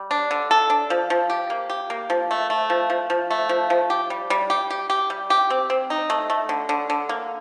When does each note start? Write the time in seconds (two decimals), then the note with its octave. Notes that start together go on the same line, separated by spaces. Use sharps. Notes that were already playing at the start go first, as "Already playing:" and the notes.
Already playing: G3
0.11 D4
0.31 D3
0.51 A4
0.70 D4
0.90 F3
1.10 F3
1.30 G4
1.50 A#3
1.70 G4
1.90 A#3
2.10 F3
2.31 A3
2.50 A3
2.70 F3
2.90 F3
3.10 F3
3.31 A3
3.49 F3
3.70 F3
3.90 G4
4.10 G3
4.30 G3
4.50 G4
4.70 G4
4.90 G4
5.10 G3
5.30 G4
5.50 C4
5.70 C4
5.90 D#4
6.10 A3
6.30 A3
6.49 D3
6.69 D3
6.90 D3
7.09 A#3